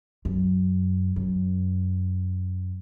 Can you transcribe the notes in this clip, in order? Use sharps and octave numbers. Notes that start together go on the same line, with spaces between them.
F#2
F#2